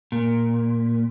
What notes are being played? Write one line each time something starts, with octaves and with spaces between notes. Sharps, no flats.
A#2